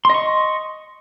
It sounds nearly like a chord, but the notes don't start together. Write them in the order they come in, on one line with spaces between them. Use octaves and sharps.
C6 D#5 C#6